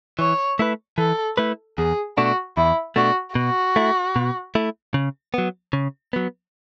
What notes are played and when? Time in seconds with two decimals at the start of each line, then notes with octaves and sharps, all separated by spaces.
0.19 E3 C#5
0.59 A3 E4 B4
0.98 E3 A4
1.37 A3 E4 B4
1.78 E2 G#4
2.17 B2 A3 D4 F#4
2.57 E2 E4
2.96 B2 A3 D4 F#4
3.35 B2 F#4
3.76 A3 E4
4.16 B2
4.55 A3 E4
4.94 C#3
5.34 F#3 B3
5.73 C#3
6.13 F#3 B3